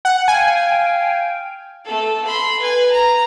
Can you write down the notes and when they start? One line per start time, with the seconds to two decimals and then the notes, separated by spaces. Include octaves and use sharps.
0.05 F#5
0.28 F5 G5 G#5
1.85 A3 A4
2.25 B5 C6
2.60 B4 G#5
2.91 A#5